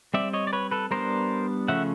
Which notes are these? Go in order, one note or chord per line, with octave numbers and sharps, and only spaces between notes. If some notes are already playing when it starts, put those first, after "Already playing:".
G3 C4 D5 E5
C#5 D#5
D5
B4 C#5
A4 B4
G3 B3 D4 A#4 C5
C#3 F3 A3 C#4 E5 F#5